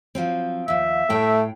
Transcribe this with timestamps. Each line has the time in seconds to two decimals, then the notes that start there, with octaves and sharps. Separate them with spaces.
0.15 F3 F#3 C4
0.68 D#2 F3 E5
1.10 A2 A3 G5